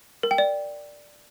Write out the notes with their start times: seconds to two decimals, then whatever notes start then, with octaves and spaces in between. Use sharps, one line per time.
0.23 A#4
0.31 G5
0.38 D5